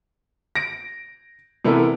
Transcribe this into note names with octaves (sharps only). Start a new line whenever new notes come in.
A#6 D7
C3 E3 B3 E4 A4 A#4